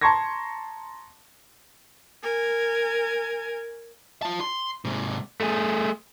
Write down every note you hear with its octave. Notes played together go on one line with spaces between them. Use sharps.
A5 A#5 C6 C#6 G#6 A#6
A#4 G#5
F4 A5
C6
G#2 C3
A3 G#4